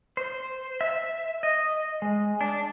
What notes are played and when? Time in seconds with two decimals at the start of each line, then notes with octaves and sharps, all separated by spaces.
0.17 C5
0.81 E5
1.43 D#5
2.02 G#3
2.41 D4